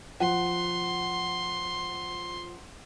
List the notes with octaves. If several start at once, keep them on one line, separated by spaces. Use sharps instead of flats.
F3 F#5 C6